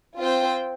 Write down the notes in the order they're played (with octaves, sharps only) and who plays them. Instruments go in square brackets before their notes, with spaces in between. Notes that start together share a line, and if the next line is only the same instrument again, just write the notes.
[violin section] C4 F4 C5 G5